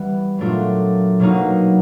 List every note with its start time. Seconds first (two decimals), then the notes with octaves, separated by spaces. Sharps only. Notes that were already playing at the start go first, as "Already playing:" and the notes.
Already playing: E3 G3 B3
0.39 A#2 F#3 A3 D4 F4
1.20 B2 F#3 A#3 D#4